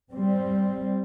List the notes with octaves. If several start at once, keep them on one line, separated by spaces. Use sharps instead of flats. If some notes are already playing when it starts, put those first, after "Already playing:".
G3 C4